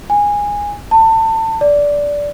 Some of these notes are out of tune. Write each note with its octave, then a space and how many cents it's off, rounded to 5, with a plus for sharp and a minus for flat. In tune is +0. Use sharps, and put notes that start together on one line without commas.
G#5 -15
A5 +25
D5 -10